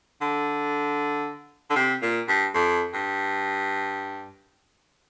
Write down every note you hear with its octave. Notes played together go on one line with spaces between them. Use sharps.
D3
D3
C3
A#2
G2
F2
G2